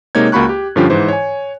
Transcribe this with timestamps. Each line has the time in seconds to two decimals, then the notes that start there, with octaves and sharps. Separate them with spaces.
0.15 C3 G#3 A#3 D#4 C#5 G#6
0.32 C#2 A#3 F#4 B5 C#6 F#6
0.49 G4
0.76 G2 D3 F3 C#4 F4 G4
0.90 G#2 E3 C5
1.08 C#5 G#5